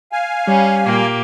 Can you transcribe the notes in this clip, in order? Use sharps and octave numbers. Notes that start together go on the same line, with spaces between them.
F5 G#5
G3 C#4
A#2 A#3 G4